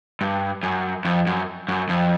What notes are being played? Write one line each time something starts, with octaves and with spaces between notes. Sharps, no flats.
G2
F#2
F2
F#2
F#2
F2